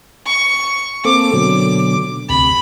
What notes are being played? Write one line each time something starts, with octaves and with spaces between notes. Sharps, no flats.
C#6
A#3 C4 A4 D6
B2 D3 F#3
D2 C3 B5